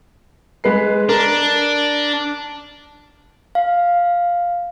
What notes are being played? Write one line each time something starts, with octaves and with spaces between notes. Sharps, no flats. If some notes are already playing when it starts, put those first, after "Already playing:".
G#3 B4 C7
D4 A#4
F5